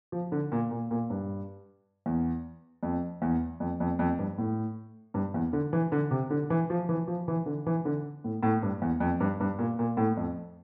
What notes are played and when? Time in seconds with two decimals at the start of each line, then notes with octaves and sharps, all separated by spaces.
0.12 F3
0.32 D3
0.52 A#2
0.71 A#2
0.91 A#2
1.10 G2
2.06 E2
2.83 F2
3.22 E2
3.60 F2
3.80 F2
3.99 F2
4.19 G2
4.38 A2
5.14 G2
5.34 E2
5.53 D3
5.73 E3
5.92 D3
6.11 C3
6.30 D3
6.50 E3
6.70 F3
6.89 E3
7.08 F3
7.28 E3
7.46 D3
7.66 E3
7.85 D3
8.24 A2
8.43 A2
8.62 G2
8.82 E2
9.00 F2
9.20 G2
9.40 G2
9.59 A#2
9.79 A#2
9.97 A2
10.17 F2